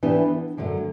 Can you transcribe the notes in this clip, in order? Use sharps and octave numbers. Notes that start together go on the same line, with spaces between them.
E3 B3 D4 G4
F#2 D3 F#3 A3